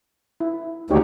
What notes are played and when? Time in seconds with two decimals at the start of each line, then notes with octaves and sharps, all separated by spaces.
0.40 E4
0.90 D2 D#4 G4 C#5